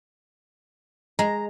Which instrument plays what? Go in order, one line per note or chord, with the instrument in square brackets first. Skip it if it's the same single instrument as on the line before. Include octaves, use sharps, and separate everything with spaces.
[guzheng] G#3 [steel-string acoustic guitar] A#5